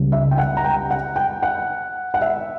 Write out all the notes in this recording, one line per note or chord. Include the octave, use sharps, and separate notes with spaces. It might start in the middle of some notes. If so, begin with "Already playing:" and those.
Already playing: C#2 C#3 G3
E5
G5
F#5
A#5
G5
F#5
G5
F#5
F#5
E5